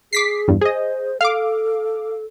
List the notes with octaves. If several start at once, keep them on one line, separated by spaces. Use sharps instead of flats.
G#4 D6 B6 C7
E2 G2
G#4 C5 D#5
A4 F5 D6